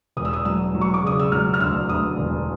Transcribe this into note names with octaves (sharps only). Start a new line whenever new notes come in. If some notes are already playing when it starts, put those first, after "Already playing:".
E1 D#6
E6
D#6
F#3 E6
F#3
C#6
D6
C#3 D#6
E6
F#3 F6
F6
D2 E6
D2 D#6
E1